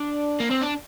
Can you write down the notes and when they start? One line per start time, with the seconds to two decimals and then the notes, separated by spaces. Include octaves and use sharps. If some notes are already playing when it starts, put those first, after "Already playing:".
Already playing: D4
0.40 A#3
0.51 C4
0.61 D4